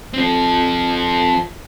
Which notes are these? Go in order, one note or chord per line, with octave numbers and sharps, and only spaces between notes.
F3 C4